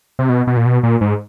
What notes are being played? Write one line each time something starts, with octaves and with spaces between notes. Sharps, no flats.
C3
B2
B2
A#2
B2
A#2
G#2